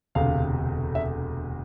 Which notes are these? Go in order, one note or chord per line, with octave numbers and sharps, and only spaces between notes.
E1 D2 C3 F5
E5